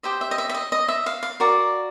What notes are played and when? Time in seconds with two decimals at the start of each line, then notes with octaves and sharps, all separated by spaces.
0.03 G4 C5 D#5 E5
0.21 E5
0.31 D#5
0.38 E5
0.49 E5
0.54 D#5
0.72 D#5
0.88 E5
1.06 F5
1.23 F5
1.40 F#4 A#4 D5